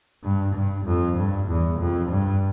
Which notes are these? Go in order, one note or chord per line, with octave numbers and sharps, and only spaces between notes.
G2
G2
F2
G2
E2
F2
G2